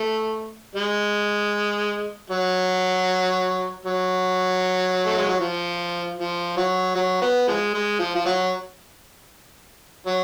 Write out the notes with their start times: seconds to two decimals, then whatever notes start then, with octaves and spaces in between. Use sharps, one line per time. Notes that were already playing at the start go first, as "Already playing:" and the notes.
Already playing: A3
0.75 G#3
2.30 F#3
3.85 F#3
5.06 A3
5.18 G#3
5.29 F#3
5.40 F3
6.19 F3
6.57 F#3
6.96 F#3
7.22 B3
7.48 F3 G#3
7.74 G#3
7.99 F3
8.16 F3
8.26 F#3
10.07 F#3